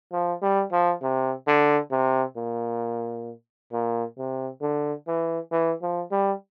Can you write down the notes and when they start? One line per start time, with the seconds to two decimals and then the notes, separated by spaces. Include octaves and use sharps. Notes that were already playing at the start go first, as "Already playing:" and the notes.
0.12 F3
0.42 G3
0.72 F3
1.02 C3
1.47 D3
1.91 C3
2.37 A#2
3.72 A#2
4.18 C3
4.62 D3
5.08 E3
5.52 E3
5.82 F3
6.12 G3